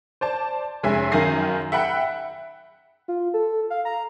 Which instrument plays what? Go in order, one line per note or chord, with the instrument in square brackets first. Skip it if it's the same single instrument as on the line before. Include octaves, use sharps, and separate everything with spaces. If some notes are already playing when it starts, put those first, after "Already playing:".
[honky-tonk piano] C5 D5 A5
F1 G#3 C#4 E5 G#5
F#2 D#3 F5 G#5 A#6 C7
E5 F#5 G5 B5 F#6 C#7
[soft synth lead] F4
A4
F5
A#5